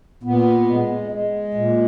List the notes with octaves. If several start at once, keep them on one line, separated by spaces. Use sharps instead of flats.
A#2 B3
G#3
G#3
A#2